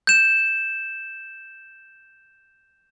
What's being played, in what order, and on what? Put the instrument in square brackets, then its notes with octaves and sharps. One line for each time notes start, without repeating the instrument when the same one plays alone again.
[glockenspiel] G6 E7